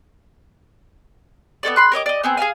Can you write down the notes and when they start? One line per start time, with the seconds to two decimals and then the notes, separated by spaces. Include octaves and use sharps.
1.63 B3 C#4 A4 D5
1.76 B5 C6 F#6
1.92 A#4 C#5 D#5 D6
2.06 D5 D#5
2.23 B3 C4 G#4
2.37 G#4 A#4 F5 G#5